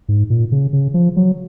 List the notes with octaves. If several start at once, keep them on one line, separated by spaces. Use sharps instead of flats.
G#2
A#2
C#3
C#3
F3
F#3